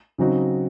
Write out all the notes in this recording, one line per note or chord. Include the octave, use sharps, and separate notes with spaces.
C#3 F#3 C4 D#4 F#4